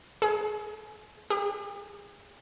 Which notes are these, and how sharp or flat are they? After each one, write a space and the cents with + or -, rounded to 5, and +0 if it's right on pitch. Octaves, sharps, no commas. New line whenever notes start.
G#4 +35
G#4 -45